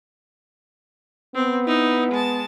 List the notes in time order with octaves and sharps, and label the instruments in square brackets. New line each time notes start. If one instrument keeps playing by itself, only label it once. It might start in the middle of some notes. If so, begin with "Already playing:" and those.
[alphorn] B3 [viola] C4
[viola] D#4 E4
G#3 A5